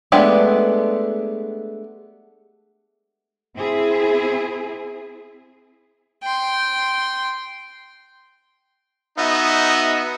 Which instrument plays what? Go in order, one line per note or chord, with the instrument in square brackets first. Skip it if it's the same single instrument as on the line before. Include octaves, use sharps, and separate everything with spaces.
[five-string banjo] G#3 A3 B3 D4 G4
[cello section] C4 E4 G#4
[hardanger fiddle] G5 C6
[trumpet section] B3 D#4 F#4 D#5 E5